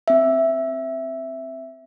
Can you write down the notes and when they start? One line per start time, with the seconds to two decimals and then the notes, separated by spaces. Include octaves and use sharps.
0.08 C4 E5